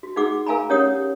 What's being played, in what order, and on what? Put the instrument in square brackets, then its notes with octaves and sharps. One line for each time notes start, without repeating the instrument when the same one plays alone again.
[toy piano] F#4
D#4 F#4 G#4 F#5 D6
A#4 F5 G#5 A#5 B5
C#4 G4 C#5 F#5 D#6